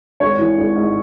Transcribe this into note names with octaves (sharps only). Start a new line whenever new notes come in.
G#1 C#5
E3
G#1
G#2